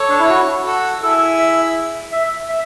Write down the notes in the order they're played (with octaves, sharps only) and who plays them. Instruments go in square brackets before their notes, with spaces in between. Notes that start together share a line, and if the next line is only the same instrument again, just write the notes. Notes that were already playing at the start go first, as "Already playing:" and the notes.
Already playing: [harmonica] A4 C#5
[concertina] D4
E4
F#4
[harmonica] F#4 A4
[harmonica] E4 G#4 [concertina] A4
[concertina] E5
E5
E5